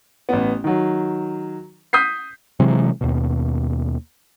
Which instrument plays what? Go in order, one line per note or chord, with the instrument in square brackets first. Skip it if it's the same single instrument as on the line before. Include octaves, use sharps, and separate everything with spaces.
[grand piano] A1 B3
D#3 F#3
D#6 G6 B6 C7
[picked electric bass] C3 E3 F#3 G#3
D#2 B2